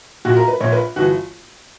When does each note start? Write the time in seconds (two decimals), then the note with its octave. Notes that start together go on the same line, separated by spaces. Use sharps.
0.25 A#1 A#2 F#4
0.37 A#4
0.48 B4
0.60 A#1 A#2 C#5
0.72 B4
0.96 G1 E3 F#4